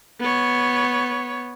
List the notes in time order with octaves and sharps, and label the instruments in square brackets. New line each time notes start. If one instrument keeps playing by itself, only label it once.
[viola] B3 C#5